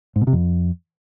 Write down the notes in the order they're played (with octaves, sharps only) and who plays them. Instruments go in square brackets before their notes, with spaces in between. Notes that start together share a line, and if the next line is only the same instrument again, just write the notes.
[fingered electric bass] G#2
B2
C3
F2